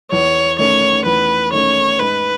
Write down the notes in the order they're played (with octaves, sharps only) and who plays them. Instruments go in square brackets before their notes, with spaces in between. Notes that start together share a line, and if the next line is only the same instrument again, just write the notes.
[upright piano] E2 [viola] C#5
[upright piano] D#3 A3 C#4 [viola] C#5
[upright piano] E2 [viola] B4
[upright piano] D#3 A3 C#4 [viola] C#5
[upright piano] G#2 [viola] B4